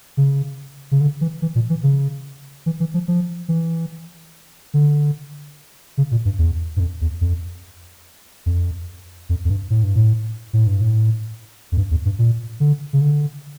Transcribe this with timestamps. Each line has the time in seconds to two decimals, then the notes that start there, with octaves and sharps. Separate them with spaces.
0.17 C#3
0.91 C#3
1.01 D3
1.21 E3
1.42 E3
1.55 A#2
1.70 E3
1.83 C#3
2.66 E3
2.80 E3
2.94 F3
3.08 F3
3.48 E3
4.74 D3
5.97 C#3
6.12 A#2
6.25 G2
6.39 E2
6.76 G2
6.80 F2
7.01 E2
7.21 F2
8.46 F2
9.29 F2
9.45 F2
9.49 G2
9.70 A2
9.83 G2
9.96 A2
10.53 A2
10.67 G2
10.81 A2
11.72 F2
11.77 G2
11.91 E2
12.05 G2
12.19 A#2
12.60 D3
12.93 C#3
13.01 D3